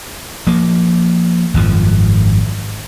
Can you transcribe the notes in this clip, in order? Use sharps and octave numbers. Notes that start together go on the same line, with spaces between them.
F3 A#3
G#1 F#2 F3